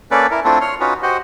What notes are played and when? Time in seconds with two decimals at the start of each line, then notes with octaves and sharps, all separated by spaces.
0.11 A#3 C#4 A4 B4 D5
0.31 E4 A#4
0.44 A3 C4 D4 E4 F4 A4
0.61 C#5 C6 F6
0.80 C#4 D#4 F4 F#4 B4
1.03 F#4 G4 C5 D#5 F#5